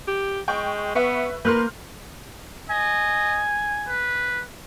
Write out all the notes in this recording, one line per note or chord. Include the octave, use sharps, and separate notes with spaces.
G4
G#3 G5 C#6 G6
B3 B4 E5 C#6
A#3 A#4 B4 C6 F6 G6
D#5 G#5
B4